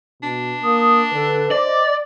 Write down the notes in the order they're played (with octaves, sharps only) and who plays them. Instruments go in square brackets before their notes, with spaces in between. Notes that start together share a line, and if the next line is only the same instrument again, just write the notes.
[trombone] B2 [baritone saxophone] D4
[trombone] A#3 [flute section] D#6
[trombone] D3 [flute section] A4 B4
[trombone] C5 [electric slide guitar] D5 [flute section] D#5 D6